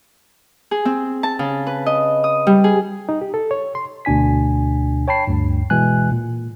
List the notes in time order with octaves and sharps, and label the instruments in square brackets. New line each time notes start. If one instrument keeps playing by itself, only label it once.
[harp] G#4
C4
A5
C#3
B4
D#5
D#6
G3
G#4
[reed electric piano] D#4
G4
A4
C#5
C6
[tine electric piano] D2 B2 D4 G#5 B6
C#5 G5 A5 B5 C7
D2 G2
B2 E3 G#3 G#5 F#6
A#2